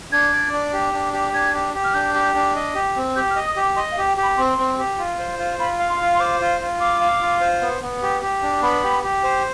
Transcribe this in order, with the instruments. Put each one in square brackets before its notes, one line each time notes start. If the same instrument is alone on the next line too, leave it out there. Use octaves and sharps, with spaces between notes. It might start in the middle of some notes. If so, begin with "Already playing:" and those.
[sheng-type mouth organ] D4 [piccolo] G#6
[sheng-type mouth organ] D5
D4
G4
D4
G4
[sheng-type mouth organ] D4 [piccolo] G#6
[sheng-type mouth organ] G4
G4
[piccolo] F6
[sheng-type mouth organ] D4 [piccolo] G6
[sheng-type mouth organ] G4
D4
D#5
G4
C4
[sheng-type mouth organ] G4 [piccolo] G6
[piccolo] F6
[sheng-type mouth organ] D#5
[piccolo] D#6
[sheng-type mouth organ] G4
[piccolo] D6
[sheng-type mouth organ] D#5 [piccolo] C6
[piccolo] F5
[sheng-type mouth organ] G4
[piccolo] G5
[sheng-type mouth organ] G4
[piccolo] B5
[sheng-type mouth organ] C4 [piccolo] C6
[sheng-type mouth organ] C4
G4
F4
C5
F4
[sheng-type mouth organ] F4 [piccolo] B5
[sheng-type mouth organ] F5
[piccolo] C6
[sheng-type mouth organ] F4
[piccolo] C6
[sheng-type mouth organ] C5 [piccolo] D6
[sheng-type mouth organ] F4
F4
[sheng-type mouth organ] F5 [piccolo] D6
[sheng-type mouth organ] F5
F4
C5
B3
B3
G4
G4
D4
[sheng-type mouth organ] B3 [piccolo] B5
[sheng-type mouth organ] G4
G4
C5